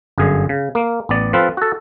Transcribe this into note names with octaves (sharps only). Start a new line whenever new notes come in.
G1 F#2 D3 G#4
C#3
A#3
A1 B3 D5
F3 C4 F4 A4 B4
F#4 A4